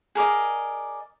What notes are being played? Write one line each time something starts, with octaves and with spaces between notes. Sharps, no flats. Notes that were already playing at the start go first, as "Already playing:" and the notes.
G#4 A#4 D5 D#5